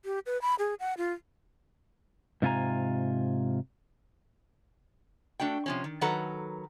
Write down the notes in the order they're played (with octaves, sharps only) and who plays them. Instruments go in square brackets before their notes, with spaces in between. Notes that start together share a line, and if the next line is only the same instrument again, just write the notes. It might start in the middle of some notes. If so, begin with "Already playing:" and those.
[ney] G4
B4
B5
G#4
F#5
F4
[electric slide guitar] G#2 C3 F4 A4 G#5 A#5
[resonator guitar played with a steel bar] A3 D4 F#4 G5
C3 F3 C#4
D#3
D#3 F#3 A4 B4 F#5 A#5